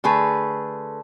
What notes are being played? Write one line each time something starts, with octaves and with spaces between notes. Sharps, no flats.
D3 A3 G#4 B4